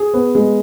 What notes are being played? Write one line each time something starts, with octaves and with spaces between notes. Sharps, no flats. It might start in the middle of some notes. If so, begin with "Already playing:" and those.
Already playing: G#4
B3
G#3